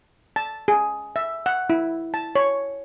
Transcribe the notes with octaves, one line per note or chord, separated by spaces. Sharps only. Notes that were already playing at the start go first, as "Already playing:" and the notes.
A5
G#4
E5
F#5
E4
A5
C#5